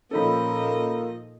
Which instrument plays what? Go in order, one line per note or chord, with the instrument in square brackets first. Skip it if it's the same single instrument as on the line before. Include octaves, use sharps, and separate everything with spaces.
[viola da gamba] A#2 D#5 [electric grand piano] F3 D#4 A4 [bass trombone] A#3 [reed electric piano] C#4 B5